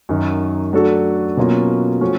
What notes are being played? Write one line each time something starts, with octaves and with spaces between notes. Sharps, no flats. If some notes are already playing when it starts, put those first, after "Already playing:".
F#2 D#3 F#3
F#3 A3 D4 F#4 A4
B2 F#3 A#3 C#4 F4
F3 A3 C#4 F#4